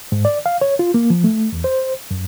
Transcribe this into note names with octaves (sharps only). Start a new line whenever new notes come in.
G#2
D5
F5
C#5
F4
A#3
F3
A3
E2
C5
F#2